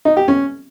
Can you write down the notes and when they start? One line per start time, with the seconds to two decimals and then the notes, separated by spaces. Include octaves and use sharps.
0.05 D#4
0.17 G4
0.28 C#4